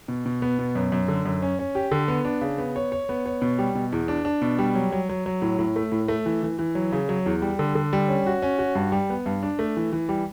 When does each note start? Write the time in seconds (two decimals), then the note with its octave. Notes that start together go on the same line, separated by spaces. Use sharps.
0.08 B2
0.26 B2
0.42 B3
0.59 B2
0.75 F#2
0.92 F#2
1.08 D3
1.26 F#2
1.42 C#4
1.59 C#4
1.75 G4
1.91 D3
2.08 B3
2.25 D4
2.41 C#3
2.58 B3
2.76 C#5
2.92 C#5
3.09 B3
3.26 C#5
3.42 B2
3.59 G3
3.75 B2
3.92 E2
4.08 D4
4.25 D4
4.42 B2
4.59 G3
4.75 F#3
4.92 F#3
5.09 F#3
5.26 F#3
5.42 A2
5.59 A2
5.76 A3
5.92 A2
6.08 A3
6.26 E3
6.43 E3
6.59 E3
6.75 F#3
6.92 C#3
7.09 F#3
7.26 E2
7.42 G3
7.59 D3
7.75 D3
7.93 G3
8.09 C#4
8.26 F#4
8.42 C#4
8.59 F#4
8.75 G2
8.92 G3
9.10 B3
9.26 G2
9.43 D4
9.59 A3
9.77 E3
9.93 E3
10.09 G3